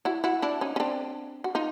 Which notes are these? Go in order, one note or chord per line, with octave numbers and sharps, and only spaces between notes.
E4 F#4
E4 F#4
D4 E4
C#4 D#4
C#4
C4 D4
F#4
D#4 F4